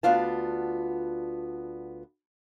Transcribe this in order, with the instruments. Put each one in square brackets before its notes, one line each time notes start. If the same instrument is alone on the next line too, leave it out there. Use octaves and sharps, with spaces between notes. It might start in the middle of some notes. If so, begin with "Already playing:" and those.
[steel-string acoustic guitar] D2 B3 D4 F4 A5